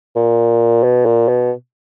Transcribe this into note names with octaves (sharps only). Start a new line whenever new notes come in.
A#2
B2
A#2
B2